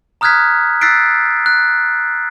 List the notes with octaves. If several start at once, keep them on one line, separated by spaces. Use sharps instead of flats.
A#5 D#6 F6 F#6 G#6 B6
E6 F#6 A6 B6 C7 D7
F#6